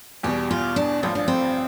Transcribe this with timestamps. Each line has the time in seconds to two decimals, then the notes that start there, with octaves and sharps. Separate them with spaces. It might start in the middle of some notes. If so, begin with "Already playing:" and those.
0.23 E2 B2 G3 G4
0.51 F4
0.76 D4
1.03 A1 G2 F3 C4
1.15 D4
1.28 C4